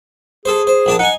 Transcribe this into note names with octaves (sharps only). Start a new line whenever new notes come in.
G#4 A4 C5
C5
A#1 D4 A5
D#4 F#5 G#5